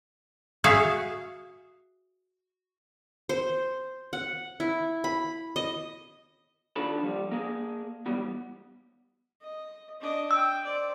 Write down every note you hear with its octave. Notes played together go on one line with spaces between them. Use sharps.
F#4 G#4 E5 F5
C5
F#5
E4
B5
D#5
D#2 D4 F4 A4 A5 B5
F3 G3
A#3 G#4
D#2 G#2 E3 G3 B3
D#5
D4 D#5
G5 E6
C5 D5